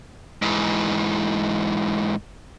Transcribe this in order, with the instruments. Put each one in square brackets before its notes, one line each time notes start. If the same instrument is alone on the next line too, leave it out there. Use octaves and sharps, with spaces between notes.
[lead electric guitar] G#2 E3